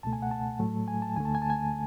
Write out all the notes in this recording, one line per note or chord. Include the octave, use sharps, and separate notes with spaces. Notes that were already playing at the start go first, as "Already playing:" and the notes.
C#2 B2 A3 A5
G#5
F#5
A5
A2 F#3 A3
G#5
A5
D2 D3 A3 G#5
A5
G#5
A5
G#5